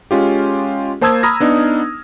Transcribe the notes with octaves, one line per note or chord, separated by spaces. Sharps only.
G#3 C#4 F4 G4
A#3 C5 A5 D#6 E6 G#6
A#5 B5 D#6 F6 A#6
B3 D4 D#4